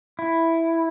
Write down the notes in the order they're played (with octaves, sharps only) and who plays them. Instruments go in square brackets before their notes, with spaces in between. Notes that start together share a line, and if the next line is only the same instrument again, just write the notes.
[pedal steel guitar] E4